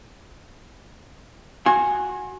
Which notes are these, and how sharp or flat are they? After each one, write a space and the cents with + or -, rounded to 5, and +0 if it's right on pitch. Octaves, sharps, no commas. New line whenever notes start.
F#4 +0 G#5 +0 C6 +40